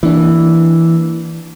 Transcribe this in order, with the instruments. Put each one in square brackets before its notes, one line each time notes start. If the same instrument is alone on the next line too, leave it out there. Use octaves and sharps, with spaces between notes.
[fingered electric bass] E3 [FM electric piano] A#3 D4